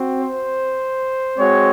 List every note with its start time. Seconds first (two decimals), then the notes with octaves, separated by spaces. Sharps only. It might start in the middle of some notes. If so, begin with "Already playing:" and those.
Already playing: C4 F#4
0.22 C5
1.38 G#3 C4 F#4 C#5